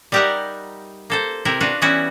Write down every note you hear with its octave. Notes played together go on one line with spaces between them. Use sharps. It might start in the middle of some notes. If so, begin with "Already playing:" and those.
G3 D#4 G4 A#4 E5 F#5
A#3 A4 C5
C3 E4 A#4 G5
D4 F4 F#4 B4
E3 G3 B3 C#4 E4 F#4